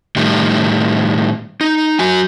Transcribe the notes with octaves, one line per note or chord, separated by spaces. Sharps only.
A2 D#3 G3
D#4
F#3 F#4 G#5